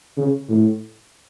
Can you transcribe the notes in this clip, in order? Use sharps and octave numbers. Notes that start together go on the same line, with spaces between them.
C#3
A2